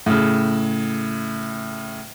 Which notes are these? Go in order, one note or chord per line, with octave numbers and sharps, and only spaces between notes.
A2 C#3